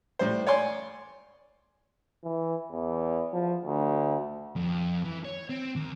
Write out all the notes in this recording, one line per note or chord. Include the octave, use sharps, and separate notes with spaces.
A2 G3 C5
C#5 D5 G#5 C6
E3
E2
F3
D2
F2
E3
C#5
C4
D#2